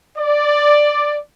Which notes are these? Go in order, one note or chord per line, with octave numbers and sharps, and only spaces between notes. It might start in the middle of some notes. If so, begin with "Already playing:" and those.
D5